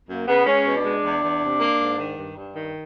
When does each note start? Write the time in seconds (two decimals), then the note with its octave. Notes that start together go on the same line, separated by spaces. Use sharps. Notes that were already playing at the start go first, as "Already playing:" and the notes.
0.08 F#2 A#3
0.27 C#3 B3
0.46 G#3 C#4
0.65 B2
0.75 D4
0.84 G#3
1.04 E2
1.23 E2
1.42 C3
1.60 A#3
1.80 G#2
1.99 D#3
2.18 G2
2.37 G2
2.56 D#3